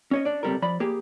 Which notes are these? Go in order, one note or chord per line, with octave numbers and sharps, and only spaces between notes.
C#4 C#5 D#5
D4 D5
C#2 C3 F#3 G3 A4 A#4
F3 D5 B5
A#3 G4 G#4